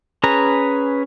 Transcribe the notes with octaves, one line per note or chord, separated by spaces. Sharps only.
C#4 G#4 B4 A#5